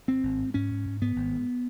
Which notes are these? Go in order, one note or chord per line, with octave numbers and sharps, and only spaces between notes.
G#1 C4
G#1
G#2
G#2 C#4
G#2
G#2
G#2 B3
G#1
G#2